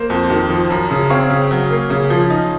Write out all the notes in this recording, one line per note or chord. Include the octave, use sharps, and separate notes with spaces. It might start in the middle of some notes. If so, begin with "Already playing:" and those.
Already playing: A#3 C5
F2
D#3
F3
F#2
C#3
C4 C#5 F5
C#3
F#3
A#3
C#3
F3
D#4